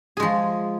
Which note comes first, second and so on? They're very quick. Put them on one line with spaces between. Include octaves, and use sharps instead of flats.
G#4 G#3 F3